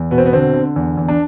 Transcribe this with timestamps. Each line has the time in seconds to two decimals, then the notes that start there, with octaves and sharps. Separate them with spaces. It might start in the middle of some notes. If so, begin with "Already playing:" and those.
Already playing: E2
0.11 B2 B3
0.18 C4
0.26 B3
0.33 D3 C4
0.54 D3
0.76 E2
0.97 E2
1.08 D4